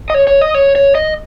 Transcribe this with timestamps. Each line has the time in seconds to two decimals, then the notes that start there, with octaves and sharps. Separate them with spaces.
0.10 D#5
0.14 C#5
0.27 C#5
0.41 D#5
0.55 C#5
0.76 C#5
0.95 D#5